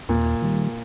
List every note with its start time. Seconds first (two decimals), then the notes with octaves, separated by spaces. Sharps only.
0.09 D#2 A#2
0.42 D#3 G3